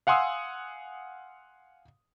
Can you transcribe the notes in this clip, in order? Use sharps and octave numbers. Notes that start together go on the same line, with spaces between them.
F5 F#5 G#5 C6 D#6 E6